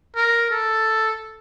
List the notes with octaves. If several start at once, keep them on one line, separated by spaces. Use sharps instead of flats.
A#4
A4